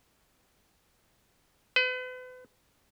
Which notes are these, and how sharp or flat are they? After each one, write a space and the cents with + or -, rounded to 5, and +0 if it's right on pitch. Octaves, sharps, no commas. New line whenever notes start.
B4 +40